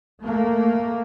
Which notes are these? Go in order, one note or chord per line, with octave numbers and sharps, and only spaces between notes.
A3 A#3